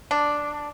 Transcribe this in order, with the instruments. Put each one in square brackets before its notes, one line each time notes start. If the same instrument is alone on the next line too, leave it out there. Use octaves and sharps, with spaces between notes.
[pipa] D4